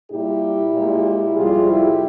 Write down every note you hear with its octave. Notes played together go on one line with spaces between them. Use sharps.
A#2 G3 E4 G4
A#2 G#3
F2 C3 G3 F4 G#4
E4 G4